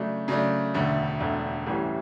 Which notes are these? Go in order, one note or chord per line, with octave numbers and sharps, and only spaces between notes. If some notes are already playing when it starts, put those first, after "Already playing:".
Already playing: C#3 F#3 A3 D4
C#3 F#3 A3 D4
E1 D2 D3 A3
E1 D2 D3 A3
A1 A2 E3 G3 C#4